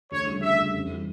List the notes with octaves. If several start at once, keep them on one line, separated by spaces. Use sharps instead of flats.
D2 C#5
C#3 G3
D2 E5
C#3 G3
F2
E3 G3